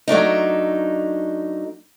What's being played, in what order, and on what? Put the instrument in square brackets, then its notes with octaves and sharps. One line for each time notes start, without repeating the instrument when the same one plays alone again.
[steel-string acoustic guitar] F#3 A3 D4 D#4